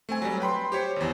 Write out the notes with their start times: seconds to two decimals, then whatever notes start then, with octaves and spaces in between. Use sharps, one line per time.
0.09 A3 C4 G#5
0.22 F#3 G3
0.40 B4 G5 B5 C6
0.72 G4 C5 C#5
0.96 G#1 E2